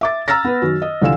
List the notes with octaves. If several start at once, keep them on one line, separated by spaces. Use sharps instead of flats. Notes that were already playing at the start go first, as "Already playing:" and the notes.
E5 D6 A6
A#5 E6 F6 A6 A#6
B3 B4
F#2 D#3
D#5
C2 D3 E3 F4 E6 E7